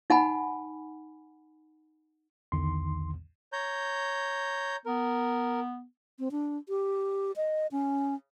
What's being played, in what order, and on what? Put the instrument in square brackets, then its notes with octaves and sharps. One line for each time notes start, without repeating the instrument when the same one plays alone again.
[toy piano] D#4 F#5 G#5 B5
[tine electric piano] B1 E2 D3 [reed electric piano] D#3 C6
[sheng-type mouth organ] C#5 A#5 G6
[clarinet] B3 [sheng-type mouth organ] A#4
[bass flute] C4
D4
G4
D#5
C#4